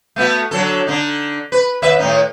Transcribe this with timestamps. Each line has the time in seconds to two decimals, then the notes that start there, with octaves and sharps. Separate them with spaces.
0.16 A3 B3 F#4
0.51 D3 F#3 A4
0.87 D3 D#4
1.52 B4
1.82 D#2 B4 E5
1.99 A2 D#3 D#4